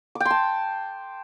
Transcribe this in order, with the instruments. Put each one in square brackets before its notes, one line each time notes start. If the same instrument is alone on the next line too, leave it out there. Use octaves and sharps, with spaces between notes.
[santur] D6
G5
C6
A5